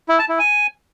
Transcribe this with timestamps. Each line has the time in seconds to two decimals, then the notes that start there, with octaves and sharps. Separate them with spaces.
0.09 E4
0.19 A5
0.29 E4
0.39 G#5